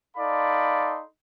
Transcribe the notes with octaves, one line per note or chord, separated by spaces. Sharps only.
D#4 A4 D5 F5 B5 C6